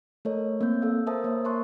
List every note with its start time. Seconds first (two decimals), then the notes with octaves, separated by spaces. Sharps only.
0.25 A3 A4 A#4 C#5 D#5
0.61 A#3 C4 G6
0.82 A4 F5 E6
1.07 A#4 C5 E5 A5 D#6
1.24 A#3 C#5 E5
1.45 A#4 A5 C6 C#6 F#6